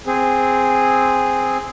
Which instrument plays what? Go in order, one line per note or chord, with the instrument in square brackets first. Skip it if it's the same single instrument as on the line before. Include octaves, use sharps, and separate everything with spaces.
[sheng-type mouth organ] C4 G#4